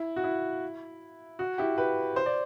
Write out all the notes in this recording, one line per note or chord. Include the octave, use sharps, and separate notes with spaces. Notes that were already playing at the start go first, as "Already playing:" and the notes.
Already playing: E4
F#4
E4
F#4
E4 G4
G4 B4
C5
D5